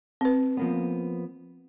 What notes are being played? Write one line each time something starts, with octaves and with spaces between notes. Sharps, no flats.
C4 B4
F3 A#3 B3